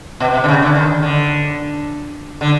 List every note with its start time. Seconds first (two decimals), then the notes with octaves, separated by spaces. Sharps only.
0.20 B2
0.34 C3
0.44 D3
0.48 C#3
0.62 D3
0.75 D#3
1.03 D3
2.41 D3